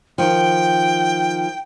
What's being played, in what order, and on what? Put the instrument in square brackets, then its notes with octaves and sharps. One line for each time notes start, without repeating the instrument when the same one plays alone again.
[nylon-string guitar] D#3 F3 [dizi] G5